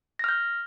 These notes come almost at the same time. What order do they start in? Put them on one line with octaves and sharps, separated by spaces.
A#6 F6 G6